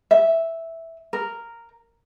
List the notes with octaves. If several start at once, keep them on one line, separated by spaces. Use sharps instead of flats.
E5
A#4